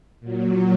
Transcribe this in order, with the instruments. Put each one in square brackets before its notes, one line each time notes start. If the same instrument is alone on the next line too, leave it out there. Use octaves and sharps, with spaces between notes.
[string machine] A#2 F#3